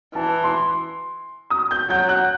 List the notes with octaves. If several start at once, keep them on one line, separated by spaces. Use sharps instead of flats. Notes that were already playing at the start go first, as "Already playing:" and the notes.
E3 A5
C6
D#6
G6
F#3 G6
F#6